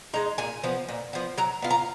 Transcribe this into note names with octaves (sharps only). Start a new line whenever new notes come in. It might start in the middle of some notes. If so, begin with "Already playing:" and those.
G#3 D#4 A#5
A#2 G#5
F3 B3
A#2
F3 B3
F#3 A#5
B3 F4
A#5